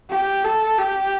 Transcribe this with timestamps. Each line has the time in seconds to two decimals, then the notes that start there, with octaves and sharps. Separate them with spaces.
0.11 G4
0.44 A4
0.78 G4